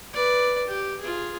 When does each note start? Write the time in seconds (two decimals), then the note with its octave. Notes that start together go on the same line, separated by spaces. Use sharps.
0.13 B4 D5
0.67 G4
1.00 F4 G#4